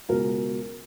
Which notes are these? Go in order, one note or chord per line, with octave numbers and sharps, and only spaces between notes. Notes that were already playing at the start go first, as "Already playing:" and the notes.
C#2 B2 F#3 A#4